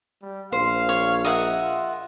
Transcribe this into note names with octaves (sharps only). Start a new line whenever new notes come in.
G3
A#1 C5 F5
C#5
A#4 D#5 E5 F#5
F4